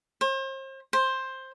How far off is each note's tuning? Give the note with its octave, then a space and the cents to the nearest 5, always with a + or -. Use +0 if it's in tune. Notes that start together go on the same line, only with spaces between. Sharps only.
C5 +40
C5 +10